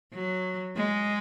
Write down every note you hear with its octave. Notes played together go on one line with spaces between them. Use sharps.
F#3
G#3